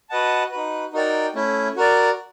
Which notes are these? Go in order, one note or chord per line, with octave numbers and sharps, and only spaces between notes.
F#4 B4 D#5 F#5 A5
D#4 F#4 B4
D#4 F#4 A#4 D5 G5
A3 C#4 E4
F#4 A#4 D5